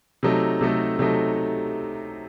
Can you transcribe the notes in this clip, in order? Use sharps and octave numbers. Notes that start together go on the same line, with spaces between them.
C3 F#3 A3 D#4 A4
C3 F#3 A3 D#4 A4
C3 F#3 A3 D#4 A4